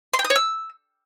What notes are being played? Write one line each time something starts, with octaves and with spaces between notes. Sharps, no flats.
C6
G5
D#6
C#5
E6